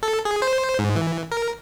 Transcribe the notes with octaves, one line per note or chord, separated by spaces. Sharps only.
A4
G#4
C5
G#2
E3
A#4